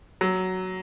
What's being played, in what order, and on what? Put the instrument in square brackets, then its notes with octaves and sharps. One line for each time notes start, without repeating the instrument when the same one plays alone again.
[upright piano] F#3